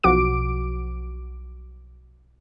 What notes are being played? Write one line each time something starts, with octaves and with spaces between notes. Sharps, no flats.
B1 F3 F#4 D6 D7